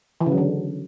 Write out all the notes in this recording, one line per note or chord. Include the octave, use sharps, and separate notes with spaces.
E3
C#3
F#3
D3